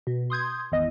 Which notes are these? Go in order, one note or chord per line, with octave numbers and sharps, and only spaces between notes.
B2
C6 D#6 G6 G#6
G#1 E2 D#5